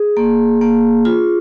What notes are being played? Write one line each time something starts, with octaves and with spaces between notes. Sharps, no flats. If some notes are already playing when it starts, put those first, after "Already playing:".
Already playing: G#4
A#3
A#3
F4